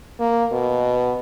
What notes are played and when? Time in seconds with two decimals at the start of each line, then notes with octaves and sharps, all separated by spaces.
0.20 A#3
0.52 B2